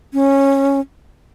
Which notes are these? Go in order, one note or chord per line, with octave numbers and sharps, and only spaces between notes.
C#4